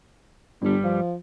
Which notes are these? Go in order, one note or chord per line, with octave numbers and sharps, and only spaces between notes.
G1 G2 G3
F3